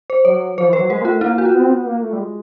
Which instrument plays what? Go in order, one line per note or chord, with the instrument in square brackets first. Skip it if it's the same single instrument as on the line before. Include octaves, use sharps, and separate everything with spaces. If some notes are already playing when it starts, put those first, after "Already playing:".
[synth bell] C5
[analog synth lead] F#3 [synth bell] C#5
[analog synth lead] F3 [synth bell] C5
[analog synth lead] E3
[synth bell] B4
[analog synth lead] F#3
[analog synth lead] G#3 [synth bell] A#4
[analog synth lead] A#3
[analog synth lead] A3 [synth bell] F4
[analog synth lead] A#3 [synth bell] E4
[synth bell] F#4
F4
[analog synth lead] B3
C4
B3
A#3
A3
G3
G#3